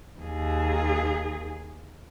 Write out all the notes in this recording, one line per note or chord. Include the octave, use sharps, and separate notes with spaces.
D#2 G#4